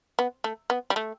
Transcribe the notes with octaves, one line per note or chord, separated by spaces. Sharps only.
B3
A3
B3
G3
A3